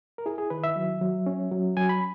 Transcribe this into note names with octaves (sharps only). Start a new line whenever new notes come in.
A#4
E4 G#4
G#4
D#3 B4
E5
F#3
F#3
C#4
F#3
F#3 G#5
B5